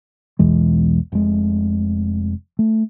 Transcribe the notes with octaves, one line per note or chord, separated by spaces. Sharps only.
B1 E2 E3 G#3
F1 G#3
A3